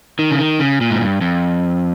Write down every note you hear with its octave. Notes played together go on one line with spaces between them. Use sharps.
D#3
C#3
D#3
C#3
A#2
G#2
G2
F2